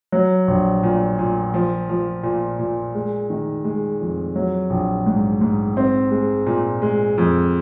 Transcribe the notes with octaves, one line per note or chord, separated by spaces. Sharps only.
F#3
A#1
A#2
A#2
F3
F3
A#2
A#2
G#3
D#3
G#3
F2
F#3
A#1
G#2
G#2
C4
G#3
A#2
G#3
F2